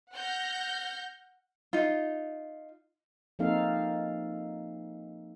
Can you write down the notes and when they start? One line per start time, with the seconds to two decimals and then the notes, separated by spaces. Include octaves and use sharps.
0.13 F#5 F6 G6 A#6
1.73 D#4 F4
3.39 F3 A#3 C4 D#4 A4 F5